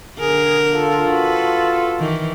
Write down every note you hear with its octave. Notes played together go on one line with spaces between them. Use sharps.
D3 G#4 A#4
F4 A4
F#4 B4
D#3 E3